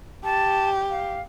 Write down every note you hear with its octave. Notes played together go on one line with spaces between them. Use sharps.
G4 A5
F5